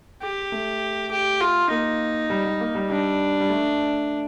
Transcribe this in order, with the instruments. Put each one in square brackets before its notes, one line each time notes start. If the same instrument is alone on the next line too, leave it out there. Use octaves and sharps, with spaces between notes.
[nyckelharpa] G4
[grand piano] A3
[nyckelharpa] G4
F4
[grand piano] A#3 [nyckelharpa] D#4
[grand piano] G3
G3
A#3
G3
[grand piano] G3 [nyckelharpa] D4
[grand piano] G3
A3